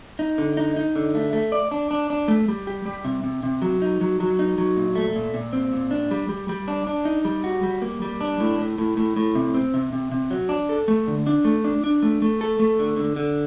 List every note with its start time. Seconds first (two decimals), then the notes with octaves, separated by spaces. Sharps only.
0.19 D#4
0.38 D3
0.57 D#4
0.76 D#4
0.96 D3
1.15 A3
1.33 A3
1.52 D5
1.71 D4
1.91 D4
2.10 D4
2.28 A3
2.48 G3
2.67 G4
2.85 G3
3.05 C3
3.24 C3
3.43 C3
3.62 F#3
3.82 D#4
4.01 F#3
4.20 F#3
4.39 D#4
4.58 F#3
4.77 A#2
4.95 A3
5.16 A#2
5.34 A#2
5.53 C4
5.73 A#2
5.91 D4
6.11 G3
6.29 G3
6.49 G3
6.68 D4
6.87 D4
7.05 D#4
7.25 G3
7.44 F#4
7.63 G3
7.82 A#3
8.02 G3
8.21 D4
8.40 A2
8.58 A2
8.78 A2
8.97 A2
9.17 A2
9.35 C3
9.54 C4
9.74 C3
9.93 C3
10.12 C3
10.31 F#3
10.49 D4
10.69 A4
10.88 A3
11.07 D3
11.27 D4
11.45 A3
11.64 D4
11.84 D4
12.03 A3
12.22 A3
12.41 A4
12.59 A3
12.79 D3
12.97 D3
13.16 D3